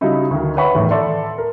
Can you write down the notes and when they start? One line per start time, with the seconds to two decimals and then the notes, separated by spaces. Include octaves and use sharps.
0.01 C#3 F#3 G3 D#4 E4
0.31 D2 D#3
0.57 B4 C#5 E5 F#5 B5 C#6
0.75 E2 A2 D#3
0.91 A4 D5 E5 C6
1.38 A#4